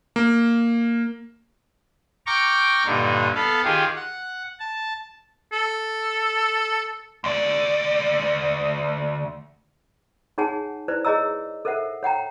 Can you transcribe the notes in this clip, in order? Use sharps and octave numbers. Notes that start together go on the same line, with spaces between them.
A#3
G5 A#5 C#6 D6 F6
G2 A#2 D3 D#4
B3 A4 B4 F5
D#3 F4 G4 G#4
F#5
A5
A4
D2 D5
D#4 G#4 C#5 F#5 G#5 A5
E4 B4 C5 D5
G#4 C#5 D#5 A#5 E6
A4 A#4 C5 E5 F#5
C#5 F#5 G5 A#5